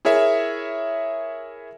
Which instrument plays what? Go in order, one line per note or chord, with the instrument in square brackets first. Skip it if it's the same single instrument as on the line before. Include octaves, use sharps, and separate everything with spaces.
[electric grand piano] E4 G#4 A#4 C#5 E5